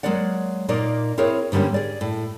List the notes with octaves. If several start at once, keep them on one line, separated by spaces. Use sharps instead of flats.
F#3 G#3 A#3 D5 F#5
A#2 A#3 D#4 D5
C4 E4 G#4 A#4 C#5
G#2 D3 G3 A#3 C#4
G#4 D5
A2